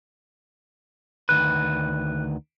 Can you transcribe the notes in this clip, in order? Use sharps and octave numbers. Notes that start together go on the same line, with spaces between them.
D2 D#3 B4 F#6